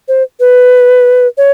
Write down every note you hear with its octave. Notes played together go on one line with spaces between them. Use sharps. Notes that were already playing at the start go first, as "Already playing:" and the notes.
C5
B4
C#5